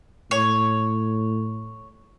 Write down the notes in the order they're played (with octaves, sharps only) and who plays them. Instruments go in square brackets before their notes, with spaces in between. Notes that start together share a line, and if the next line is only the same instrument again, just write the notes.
[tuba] A2 [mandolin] C#5